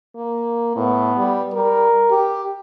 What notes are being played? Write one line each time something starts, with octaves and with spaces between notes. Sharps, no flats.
A#3
A2 B3
G3
G3 A#4
G4